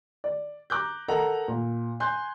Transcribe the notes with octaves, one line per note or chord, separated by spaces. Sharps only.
D5
A#5 D6 F#6 G6
A4 A#4 D#5 F#5 A#5
A#2
G#5 C6 F#6 G6